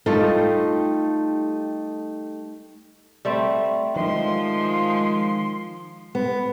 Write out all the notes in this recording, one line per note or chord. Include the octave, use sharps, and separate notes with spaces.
G3 A3 D#4 F4 G4 A4
G3 A3 C4
D#3 F3 G#3 C6
B3